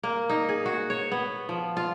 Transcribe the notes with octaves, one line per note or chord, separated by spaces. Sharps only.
A#3
D#4
G#4
F#4
C#5
B3
F3
F4